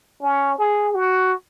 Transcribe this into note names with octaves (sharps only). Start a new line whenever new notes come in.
C#4
G#4
F#4